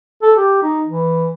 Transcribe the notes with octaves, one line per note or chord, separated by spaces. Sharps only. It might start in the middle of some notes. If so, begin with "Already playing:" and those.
A4
G4
D#4
E3